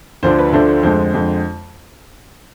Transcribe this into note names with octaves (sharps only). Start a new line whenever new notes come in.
D2 D3 F3 A3 D4 C5
B4
D2 D3 F3 A3 D4 C5
C5
F2 D3 G#3 C5
F2 D3 G#3